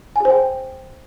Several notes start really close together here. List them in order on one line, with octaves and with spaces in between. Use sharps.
G#5 G#4 C5 G5